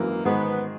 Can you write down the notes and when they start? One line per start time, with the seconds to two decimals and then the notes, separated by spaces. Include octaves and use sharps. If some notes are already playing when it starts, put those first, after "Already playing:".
Already playing: G#1 F#2 E3 A#3
0.25 G#2 D#3 G#3 B3 D#4 G#4